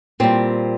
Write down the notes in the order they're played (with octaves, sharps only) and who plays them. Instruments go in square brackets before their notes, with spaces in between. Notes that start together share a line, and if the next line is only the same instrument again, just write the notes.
[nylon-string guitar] A#2 G3 C4